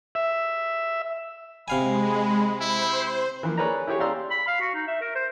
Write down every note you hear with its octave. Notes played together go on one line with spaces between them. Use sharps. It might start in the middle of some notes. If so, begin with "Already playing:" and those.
E5
C3 G#3 F5 G#5 B5
E4 C5
E3 F3 A#3
G#4 A#4 B4 C#5 D5 A#5
E4 G4 G#4 C#5
G4 D5 F5 A#5 C6 E6
B5
F5
F#4
D#4
E5
A#4
C5